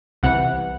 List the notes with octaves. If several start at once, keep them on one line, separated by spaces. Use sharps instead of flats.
C2 C3 E3 F#5